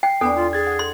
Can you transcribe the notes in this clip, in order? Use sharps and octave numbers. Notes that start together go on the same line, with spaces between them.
G5 C7
E2 B3 D4 A4 D5
F4
G#4 G#6 A6
F#5
A4 C6